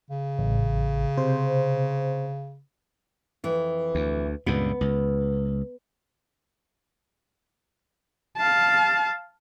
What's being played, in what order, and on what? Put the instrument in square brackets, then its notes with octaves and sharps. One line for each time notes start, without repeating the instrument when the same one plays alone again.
[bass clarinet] C#3
[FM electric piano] A1
C3 C5
[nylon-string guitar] F2 E3
[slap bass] D2
[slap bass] C#2 G2 A#2 [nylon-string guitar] B3
[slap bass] C#2
[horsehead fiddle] F5 A5